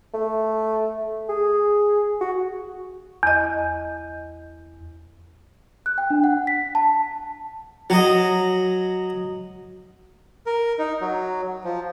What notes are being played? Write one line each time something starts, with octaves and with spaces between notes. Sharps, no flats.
A3
G#4
F#4
E2 D#5
F#6
G5
D4
F#5
B6
A5
F#3 F#4 D#5
A#4
D#4
F#3
F3